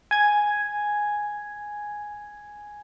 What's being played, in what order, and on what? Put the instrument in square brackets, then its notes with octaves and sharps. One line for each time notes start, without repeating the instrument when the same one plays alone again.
[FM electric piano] G#5 G#6